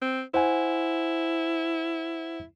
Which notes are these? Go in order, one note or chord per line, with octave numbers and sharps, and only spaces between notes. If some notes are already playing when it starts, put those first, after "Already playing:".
C4
E4 C5 F#5 G#5